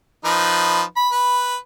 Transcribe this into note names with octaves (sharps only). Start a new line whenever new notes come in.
F3 D#4 B4
B5
B4